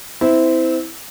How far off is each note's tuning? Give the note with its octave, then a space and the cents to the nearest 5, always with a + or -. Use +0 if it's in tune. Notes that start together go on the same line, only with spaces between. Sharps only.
C4 -20 E4 -15